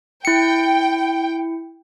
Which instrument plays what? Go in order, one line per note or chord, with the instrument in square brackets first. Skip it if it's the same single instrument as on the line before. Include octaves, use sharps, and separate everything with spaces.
[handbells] E4 C#7 [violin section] G5